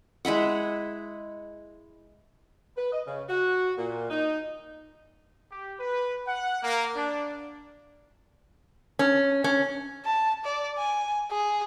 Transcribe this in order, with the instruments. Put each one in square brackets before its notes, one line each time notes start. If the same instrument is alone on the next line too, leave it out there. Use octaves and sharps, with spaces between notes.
[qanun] G#3 E4 E5 F#5
[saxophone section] B4
D#5
C#3
F#4
A#2
D#4
[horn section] G4
B4
F#5
A#3
D4
[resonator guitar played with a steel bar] C#4
C#4
[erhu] A5
D5
G#5
G#4